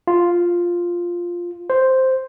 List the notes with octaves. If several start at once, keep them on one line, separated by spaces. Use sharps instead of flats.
F4
C5